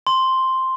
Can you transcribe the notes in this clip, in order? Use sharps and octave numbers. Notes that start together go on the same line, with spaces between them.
C6